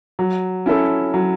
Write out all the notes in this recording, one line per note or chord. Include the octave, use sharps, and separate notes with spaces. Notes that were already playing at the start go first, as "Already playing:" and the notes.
F#3
C#4 E4 A4
F#3